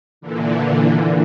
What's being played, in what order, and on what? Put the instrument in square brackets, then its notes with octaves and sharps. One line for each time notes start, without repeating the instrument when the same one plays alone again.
[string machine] A#2 D3 E3